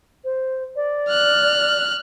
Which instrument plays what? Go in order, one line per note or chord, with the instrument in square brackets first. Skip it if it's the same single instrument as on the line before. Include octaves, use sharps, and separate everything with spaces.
[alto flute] C5
D5
[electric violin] F6 F#6